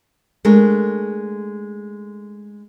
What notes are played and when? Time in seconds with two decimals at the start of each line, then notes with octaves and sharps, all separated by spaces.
0.45 G#3 A3 D4 A#4